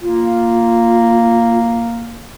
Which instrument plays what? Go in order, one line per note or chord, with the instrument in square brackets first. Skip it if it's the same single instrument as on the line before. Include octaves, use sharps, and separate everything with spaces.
[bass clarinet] A#3 [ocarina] F4